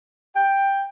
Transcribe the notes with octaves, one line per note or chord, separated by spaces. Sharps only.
G5